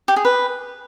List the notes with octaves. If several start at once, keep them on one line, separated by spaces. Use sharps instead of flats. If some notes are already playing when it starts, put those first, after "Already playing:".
G4
G#4
B4